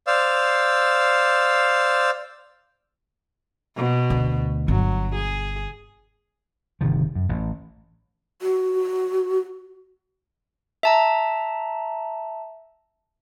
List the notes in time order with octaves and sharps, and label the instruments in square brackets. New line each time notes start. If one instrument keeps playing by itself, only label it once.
[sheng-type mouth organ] C5 D5 F5 E6
[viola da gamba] B2
[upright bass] D2
[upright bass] G1 [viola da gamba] F#3
[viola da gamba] G#4
[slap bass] G1 C3 D#3 F3
F#2
A1
[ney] F#4
[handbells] E5 A5 A#5